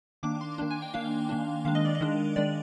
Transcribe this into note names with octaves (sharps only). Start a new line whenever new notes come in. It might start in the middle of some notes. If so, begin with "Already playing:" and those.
D#3 A#3 D4 D6
C6
D#3 A#3 D4
G#5
G5
D#3 A#3 D4 F5
D#3 A#3 D4
D#3 G#3 D4 F5
D#5
D5
D#5
D#3 G#3 D4
D#3 G#3 D4 D5